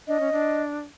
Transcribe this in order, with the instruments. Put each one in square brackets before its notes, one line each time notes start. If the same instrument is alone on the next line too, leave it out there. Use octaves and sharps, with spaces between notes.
[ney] D4 [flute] D#5
[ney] C#4
D4